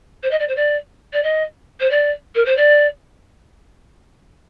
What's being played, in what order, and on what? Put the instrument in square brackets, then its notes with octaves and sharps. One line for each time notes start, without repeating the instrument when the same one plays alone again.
[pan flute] C5
D#5
D5
C5
D5
D5
D#5
C5
D5
A#4
C5
D5